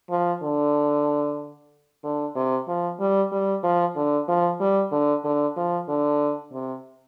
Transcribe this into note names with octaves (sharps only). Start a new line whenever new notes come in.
F3
D3
D3
C3
F3
G3
G3
F3
D3
F3
G3
D3
D3
F3
D3
C3